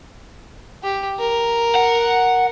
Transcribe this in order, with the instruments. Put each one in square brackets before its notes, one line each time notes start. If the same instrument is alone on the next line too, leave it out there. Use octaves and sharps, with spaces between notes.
[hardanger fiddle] G4
A#4
[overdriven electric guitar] F#5